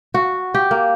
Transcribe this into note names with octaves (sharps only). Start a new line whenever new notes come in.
F#4
G4
A#3